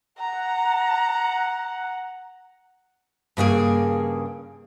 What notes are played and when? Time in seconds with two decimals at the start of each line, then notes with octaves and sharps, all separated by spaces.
0.18 F#5 A#5
3.37 G2 C#3 A#3 G#4